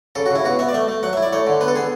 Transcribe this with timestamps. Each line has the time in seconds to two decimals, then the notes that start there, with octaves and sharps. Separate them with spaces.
0.15 C#3 A4
0.26 F#4
0.30 C#3
0.35 E4
0.44 B2 F#4
0.59 B3 E5
0.69 D5
0.74 A3 E5
0.88 A3
1.03 F#3 F#5
1.13 E5
1.17 E4
1.23 D5
1.33 A3 C#5
1.47 D3
1.61 B3 B4
1.68 A4
1.75 B3 G#4